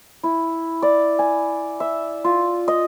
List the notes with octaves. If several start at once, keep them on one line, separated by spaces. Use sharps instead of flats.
E4
D5
G#5
E5
F4
D#5